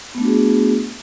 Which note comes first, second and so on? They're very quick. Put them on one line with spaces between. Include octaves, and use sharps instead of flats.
B3 A3 D4 F#4 G#4